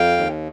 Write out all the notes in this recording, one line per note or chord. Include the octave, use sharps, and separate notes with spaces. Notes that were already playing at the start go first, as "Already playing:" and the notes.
Already playing: F2 F5 G5
D#2